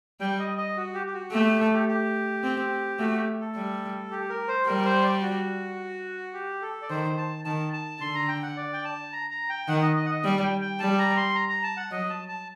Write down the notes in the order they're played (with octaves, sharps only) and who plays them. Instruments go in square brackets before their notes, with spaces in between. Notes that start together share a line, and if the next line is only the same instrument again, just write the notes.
[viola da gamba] G3 [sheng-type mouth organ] G5
[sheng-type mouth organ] D#5
D#5
F#4
G4
G4
F#4
[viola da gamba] A3 [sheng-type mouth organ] G4
[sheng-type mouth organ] G4
A4
G4
G4
[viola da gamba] C4
[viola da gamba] A3 [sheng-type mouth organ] F#4
[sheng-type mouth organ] G4
A4
[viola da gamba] G3
[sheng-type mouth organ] G4
A#4
C5
[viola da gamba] G3 [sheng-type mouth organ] A#4
[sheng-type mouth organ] C5
D5
F#4
G4
A4
D5
[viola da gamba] D#3 [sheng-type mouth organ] C5
[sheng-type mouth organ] A5
[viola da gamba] D#3 [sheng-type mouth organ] A5
[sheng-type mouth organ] A5
[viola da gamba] D3 [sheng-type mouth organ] C6
[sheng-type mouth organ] A#5
G5
F#5
D5
G5
A5
A#5
A#5
G5
[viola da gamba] D#3 [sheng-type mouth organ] F#5
[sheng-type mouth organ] D#5
D#5
F#5
D#5
[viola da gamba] G3
[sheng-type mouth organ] G5
G5
[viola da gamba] G3 [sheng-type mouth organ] A5
[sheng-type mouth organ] A#5
C6
A#5
A#5
A5
F#5
[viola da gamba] F#3 [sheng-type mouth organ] D#5
[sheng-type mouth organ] A5
A5